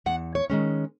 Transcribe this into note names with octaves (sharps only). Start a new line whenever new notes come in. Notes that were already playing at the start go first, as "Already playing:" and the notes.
E2 F#5
C#5
D#3 G#3 C#4